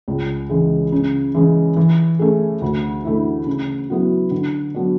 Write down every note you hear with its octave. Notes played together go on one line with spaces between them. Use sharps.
C#2
C#3 E3 G#3
C#3
E3 G#3 C#4
E3
A3 C#4 G#4
D2
D3 A3 E4
C#3
F#3 B3 E4
D3
F#3 B3 D4